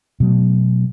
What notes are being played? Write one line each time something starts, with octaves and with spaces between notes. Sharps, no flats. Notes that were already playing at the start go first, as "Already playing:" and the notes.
B2 F#3 A3